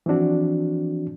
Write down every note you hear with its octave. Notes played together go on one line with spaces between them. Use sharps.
E3 F3 C4 D4 F#4